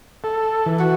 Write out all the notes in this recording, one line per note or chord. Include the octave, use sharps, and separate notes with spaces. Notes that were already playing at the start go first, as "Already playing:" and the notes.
A4
E3
F#4